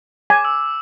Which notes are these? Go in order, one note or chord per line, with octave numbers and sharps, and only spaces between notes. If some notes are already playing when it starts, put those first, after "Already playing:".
G#5 D6
E6